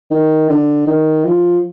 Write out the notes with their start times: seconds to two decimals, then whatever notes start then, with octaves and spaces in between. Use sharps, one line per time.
0.11 D#3
0.49 D3
0.87 D#3
1.24 F3